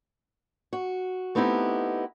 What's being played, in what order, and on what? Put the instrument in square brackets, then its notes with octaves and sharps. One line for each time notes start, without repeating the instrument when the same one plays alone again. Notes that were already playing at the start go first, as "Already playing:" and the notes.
[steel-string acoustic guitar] F#4
A3 B3 C4 D#4 E4 G4